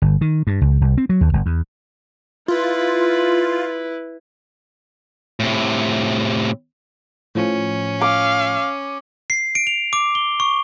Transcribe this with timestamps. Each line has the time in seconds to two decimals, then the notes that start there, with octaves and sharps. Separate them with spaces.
0.02 G1
0.21 D#3
0.47 G2
0.61 C#2
0.81 C2
0.98 C4
1.09 F#3
1.21 D#2
1.33 G1
1.46 E2
2.48 E4 F4 B4
5.40 A2 C3
7.35 A2 F3 C#4
8.01 F5 D6
9.30 C7
9.55 D7
9.67 F7
9.93 D6
10.15 G7
10.40 C#6